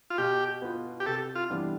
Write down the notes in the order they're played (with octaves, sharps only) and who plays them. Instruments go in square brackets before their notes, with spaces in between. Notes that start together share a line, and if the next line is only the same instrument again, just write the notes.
[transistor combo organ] F4
[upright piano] B2 [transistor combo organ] G4
[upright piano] B3 F4
[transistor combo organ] G4
[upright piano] C3 [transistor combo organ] A4
[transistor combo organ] F4
[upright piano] E3 G3 B3 D4